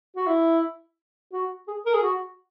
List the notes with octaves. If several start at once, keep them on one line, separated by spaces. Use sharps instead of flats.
F#4
E4
F#4
G#4
A#4
G#4
F#4